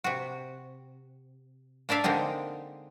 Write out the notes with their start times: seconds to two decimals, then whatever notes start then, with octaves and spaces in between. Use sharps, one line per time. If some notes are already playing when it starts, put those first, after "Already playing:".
0.04 C3 F#4
1.89 A#3 D4 D5 E5 F5
2.04 D3 G#3 A#3 C4 D#4